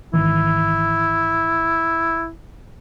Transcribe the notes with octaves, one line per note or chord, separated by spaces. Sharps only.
G#1 D#3 E3 E4